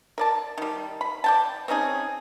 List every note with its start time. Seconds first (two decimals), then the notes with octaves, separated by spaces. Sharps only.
0.18 A#4 D5 A5
0.58 D#3 G3
1.01 B5
1.24 D5 G5 A5
1.68 C4 C#4 D#4 G#4